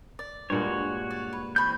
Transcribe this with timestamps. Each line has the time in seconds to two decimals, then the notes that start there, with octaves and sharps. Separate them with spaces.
0.19 D5
0.50 G2 A#2 G#3 F#4 C#5
1.11 D5
1.33 B4
1.56 E3 C4 D5 B5 C#6 G6